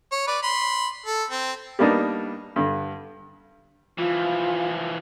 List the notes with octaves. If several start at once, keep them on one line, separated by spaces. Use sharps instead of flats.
C#5
B4 D5
B5 C6
A4
C4
G3 A#3 B3 D4 D#4
G2 D3
E3 F3 F4